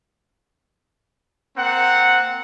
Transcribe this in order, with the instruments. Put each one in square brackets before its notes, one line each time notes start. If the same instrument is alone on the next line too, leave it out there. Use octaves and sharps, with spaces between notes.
[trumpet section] A#3 C4 F#5